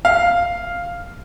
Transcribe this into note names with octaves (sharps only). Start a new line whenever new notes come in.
F5